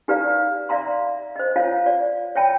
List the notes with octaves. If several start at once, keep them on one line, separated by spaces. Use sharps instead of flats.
D#4 G4 B4 D5 F5 A#5
D5 E5 F5 A#5 C6
C5 D#5
F4 C#5 F5 A5
D5
C#5 E5 G5 A5 B5